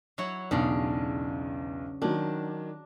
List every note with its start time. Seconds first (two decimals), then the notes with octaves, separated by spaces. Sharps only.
0.18 F#3 E4 C#5
0.51 B1 E2 C#3 D4
2.02 D#3 F#3 D4